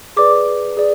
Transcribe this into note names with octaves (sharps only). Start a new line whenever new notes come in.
G#4 B4 D5 D6
G#4 D5